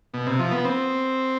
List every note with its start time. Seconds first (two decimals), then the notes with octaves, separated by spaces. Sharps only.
0.14 B2
0.27 C3
0.39 F3
0.52 B3
0.65 C4